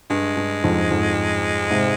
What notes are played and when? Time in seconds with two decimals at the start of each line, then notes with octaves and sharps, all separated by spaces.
0.10 G2 G#3
0.37 G2
0.63 F2 G#2
0.91 F2 G#2
1.70 G#2 C3